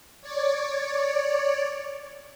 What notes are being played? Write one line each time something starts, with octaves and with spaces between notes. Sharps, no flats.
C#5 D5